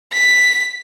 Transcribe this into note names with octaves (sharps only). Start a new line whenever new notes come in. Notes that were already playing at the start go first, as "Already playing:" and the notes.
B6